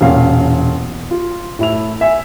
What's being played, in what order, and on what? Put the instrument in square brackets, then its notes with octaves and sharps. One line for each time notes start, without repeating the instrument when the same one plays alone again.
[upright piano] E1 A#2 C#4 F5
F4
A2 E4 F7
E5 G#5